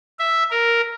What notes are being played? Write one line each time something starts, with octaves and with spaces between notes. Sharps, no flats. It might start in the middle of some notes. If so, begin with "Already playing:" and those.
E5
A#4